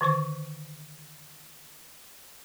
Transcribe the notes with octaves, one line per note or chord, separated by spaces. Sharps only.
D3 D#3 C5 C#6